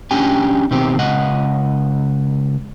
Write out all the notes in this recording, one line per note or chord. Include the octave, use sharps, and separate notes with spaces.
C#4 D4 G4 G5 G#5
B2 D#3 C4 G4
C#2 D#5 F#5